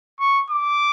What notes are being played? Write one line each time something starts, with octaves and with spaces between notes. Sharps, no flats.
C#6
D6